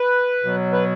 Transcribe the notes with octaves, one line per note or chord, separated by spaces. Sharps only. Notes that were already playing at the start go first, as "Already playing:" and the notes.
Already playing: B4
B2 F#3
B4